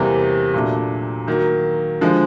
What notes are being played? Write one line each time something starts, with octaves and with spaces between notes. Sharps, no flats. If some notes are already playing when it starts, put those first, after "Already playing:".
Already playing: E2 C3 E3 G3 A#3
A#2 F#3 A3 D4
D#3 F#3 A#3
D3 F3 G#3